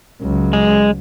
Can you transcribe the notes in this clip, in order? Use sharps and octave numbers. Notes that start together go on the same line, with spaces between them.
C#2 F#3
G#3